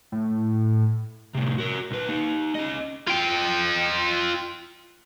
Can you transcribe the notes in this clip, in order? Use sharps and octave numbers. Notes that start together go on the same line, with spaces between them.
A2
A2 C3
F#4 A#4
B1 B4
A#3 D#4
C#4 D#5
F4 G5